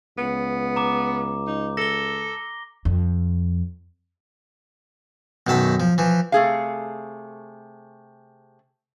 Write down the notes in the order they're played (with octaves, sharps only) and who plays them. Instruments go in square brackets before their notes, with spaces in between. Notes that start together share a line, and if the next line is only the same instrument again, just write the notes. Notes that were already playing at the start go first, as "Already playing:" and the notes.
[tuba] C#2 [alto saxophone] B3
[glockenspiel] A#5 D6
[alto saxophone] D#4
[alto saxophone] A4 [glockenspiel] A#6 G7
[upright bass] F2
[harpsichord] B1 F#2 D#3 A5 B5
F3
E3 F3
[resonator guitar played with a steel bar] C3 A3 G#4 F5